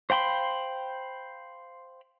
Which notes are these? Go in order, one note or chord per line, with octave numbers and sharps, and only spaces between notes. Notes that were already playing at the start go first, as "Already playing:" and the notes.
C5 F5 G5 B5 C6